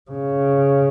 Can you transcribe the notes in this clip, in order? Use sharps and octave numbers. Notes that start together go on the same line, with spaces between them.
C#3